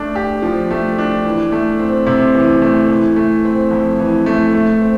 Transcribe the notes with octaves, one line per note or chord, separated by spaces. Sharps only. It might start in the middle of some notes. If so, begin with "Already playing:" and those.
Already playing: A3 D4
G4
F3
A3
D4
E3
A3
C4
C3
E3
A3
E3
A3
C4
F2
E3
A3
A3
C4